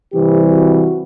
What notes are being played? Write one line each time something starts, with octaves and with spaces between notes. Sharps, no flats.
C3 E3 G3 C4 G4
F#4